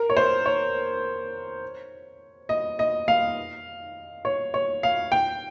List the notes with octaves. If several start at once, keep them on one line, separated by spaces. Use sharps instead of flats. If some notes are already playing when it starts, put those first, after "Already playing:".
Already playing: A#4
C#5
C5
C#5
D#5
D#5
F5
C#5
C#5
F5
G5